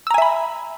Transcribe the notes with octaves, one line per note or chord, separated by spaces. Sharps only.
E5 G#5 A#5 B5 E6